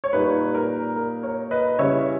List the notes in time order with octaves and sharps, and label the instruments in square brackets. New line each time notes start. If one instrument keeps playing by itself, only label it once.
[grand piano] C#5
A#2 G3 A#3 D#4 B4
A#4
A#4
A#4 C#5
B4 D#5
C#3 G3 C#4 E4 C#5 E5